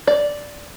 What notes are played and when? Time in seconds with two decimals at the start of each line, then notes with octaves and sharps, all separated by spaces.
0.07 D5